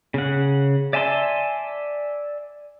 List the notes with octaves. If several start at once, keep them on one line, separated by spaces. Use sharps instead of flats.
C#3 F#5
D5 E5 G#5 A5 C6